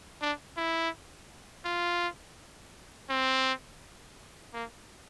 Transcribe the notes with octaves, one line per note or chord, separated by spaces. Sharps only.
D4
E4
F4
C4
A#3